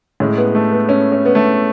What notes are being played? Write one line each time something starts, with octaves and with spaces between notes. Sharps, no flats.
A2 G#3 C#4
B3
A3
B3
C#4
C#4
B3
A3